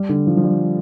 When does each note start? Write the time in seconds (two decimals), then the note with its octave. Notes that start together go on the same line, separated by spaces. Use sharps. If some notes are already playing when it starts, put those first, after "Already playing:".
Already playing: G3
0.09 D3
0.27 F3
0.37 F3
0.44 G3